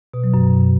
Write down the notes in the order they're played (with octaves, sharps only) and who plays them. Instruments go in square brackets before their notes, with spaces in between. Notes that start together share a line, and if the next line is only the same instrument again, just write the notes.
[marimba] B2
F#3
F#2